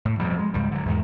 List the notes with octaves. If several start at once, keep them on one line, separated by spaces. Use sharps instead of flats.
A2
F2 B2 G3
G#3
C#2 G#2 G3
D3 F#3
E2 G#2 D#3